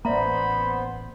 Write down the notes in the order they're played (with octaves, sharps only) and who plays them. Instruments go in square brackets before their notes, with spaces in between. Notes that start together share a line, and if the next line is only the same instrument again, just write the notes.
[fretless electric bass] A1 A#3 [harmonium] B3 C5 [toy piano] D5 E5 A#5 [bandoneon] B5